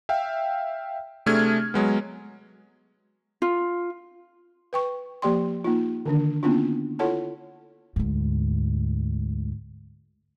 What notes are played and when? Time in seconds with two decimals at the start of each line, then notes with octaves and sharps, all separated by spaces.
0.09 E5 F5 G5
1.26 C3 A3 D4 G#4 F6 G#6
1.74 F#3 G#3 B3
3.42 F4
4.73 B4 G5 C#6
5.22 F3 A#3 G4 D5 G5 C6
5.64 A#3 D#4 F4
6.06 D3 D#3 D4
6.43 A#3 B3 C#4 D4 E4 F4
6.99 E4 F4 A4 C#5 F#5 A5
7.96 D2 G#2